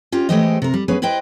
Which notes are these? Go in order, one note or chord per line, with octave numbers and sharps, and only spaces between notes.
C#4 F4 G4
E3 G#3 A3 G4 C5 D#5
C3 A#4
G3
F#3 B3 C#4 G#4 B4
E4 B4 C5 D#5 G5